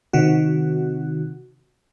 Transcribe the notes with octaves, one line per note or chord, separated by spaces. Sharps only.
C3 D#3 F#4